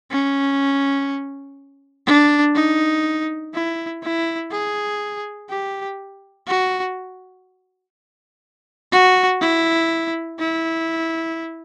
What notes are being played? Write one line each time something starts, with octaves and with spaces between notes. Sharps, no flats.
C#4
D4
D#4
E4
E4
G#4
G4
F#4
F#4
E4
E4